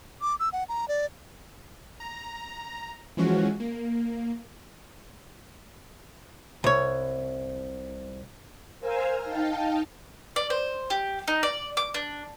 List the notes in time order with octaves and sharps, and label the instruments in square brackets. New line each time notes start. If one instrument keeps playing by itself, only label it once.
[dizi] D6
E6
F#5
A#5
D5
[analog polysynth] A#5
E3 F3 G#3 C#4 F#4
A#3
[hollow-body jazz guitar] C2 C#5
[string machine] A#4 C5 F5 G#5 E6 F6
D#4 F5 G5 A5
[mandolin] D5
C5
G4
D#4
D5
D6
D4